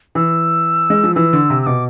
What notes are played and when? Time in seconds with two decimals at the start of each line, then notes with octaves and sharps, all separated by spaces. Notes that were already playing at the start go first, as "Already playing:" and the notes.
0.15 E3 E6
0.90 G#3
1.04 F3
1.16 E3 E6
1.33 D3
1.50 C3
1.62 E6
1.66 B2 D6